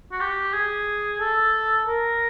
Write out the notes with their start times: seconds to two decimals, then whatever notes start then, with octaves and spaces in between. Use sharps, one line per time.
0.12 F#4
0.21 G4
0.54 G#4
1.20 A4
1.87 A#4